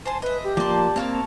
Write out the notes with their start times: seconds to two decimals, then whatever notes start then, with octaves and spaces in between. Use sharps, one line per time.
0.06 C5 G#5 A5 C6
0.22 B4 D#5 E5
0.44 G4
0.57 F3 A#3 D5 A5 C6
0.96 A#3 C4 C#5 F5 A5